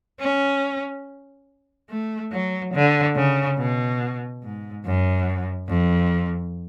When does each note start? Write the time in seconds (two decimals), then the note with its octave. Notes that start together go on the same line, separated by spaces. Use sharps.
0.20 C#4
1.90 A3
2.32 F#3
2.74 D3
3.16 C#3
3.58 B2
4.43 G#2
4.86 F#2
5.69 F2